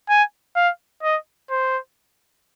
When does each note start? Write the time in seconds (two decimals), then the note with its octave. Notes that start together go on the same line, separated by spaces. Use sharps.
0.09 G#5
0.56 F5
1.03 D#5
1.50 C5